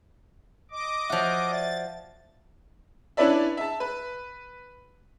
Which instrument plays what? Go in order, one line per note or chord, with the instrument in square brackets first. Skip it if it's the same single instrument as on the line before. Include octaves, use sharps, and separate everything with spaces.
[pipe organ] D#5 D6
[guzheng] F3 F#4 [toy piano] C#5 E5
[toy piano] D5 E5 [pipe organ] A6
[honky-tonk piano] C#4 D4 E4 B4 D5 E5
E5 A5
B4